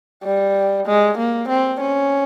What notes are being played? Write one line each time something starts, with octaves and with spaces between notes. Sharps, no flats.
G3
G#3
A#3
C4
C#4